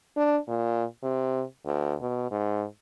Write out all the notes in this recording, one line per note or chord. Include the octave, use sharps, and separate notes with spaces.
D4
A#2
C3
D2
B2
G#2